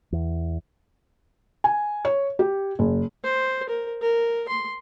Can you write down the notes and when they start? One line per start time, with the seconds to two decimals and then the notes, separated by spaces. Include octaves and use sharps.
0.12 E2
1.64 G#5
2.05 C#5
2.39 G4
2.79 F#1
3.24 C5
3.69 A#4
4.01 A#4
4.49 C6